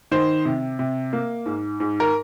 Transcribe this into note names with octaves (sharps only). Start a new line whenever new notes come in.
D#3 C5
C3
C3
A#3
G#2
G#2
A#4